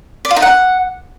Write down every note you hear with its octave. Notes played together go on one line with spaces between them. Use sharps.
D5
F4
D#4
F#5